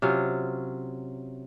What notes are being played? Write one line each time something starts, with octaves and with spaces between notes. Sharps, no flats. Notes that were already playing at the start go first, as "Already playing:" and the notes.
C3 F#3 C#4 F4